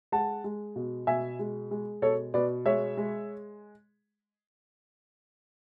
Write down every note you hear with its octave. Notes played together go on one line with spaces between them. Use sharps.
G#3 F#5 A5
G#3
B2
B2 E5 G#5
G#3
G#3
B2 A4 C#5
B2 B4 D5
G#3 C#5 E5
G#3